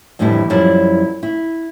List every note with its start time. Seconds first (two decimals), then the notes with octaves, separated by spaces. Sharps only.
0.19 F2 A2 D3 E3 G3 E4
0.50 F#2 F3 G3 E4 D5
1.23 E4